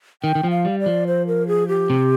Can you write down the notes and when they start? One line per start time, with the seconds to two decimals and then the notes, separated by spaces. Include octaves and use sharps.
0.23 D#3 G5
0.35 D#3
0.44 F3
0.51 F5
0.65 G3
0.79 D5
0.86 F3
1.07 C5
1.27 A#4
1.48 G#4
1.68 G4
1.90 C3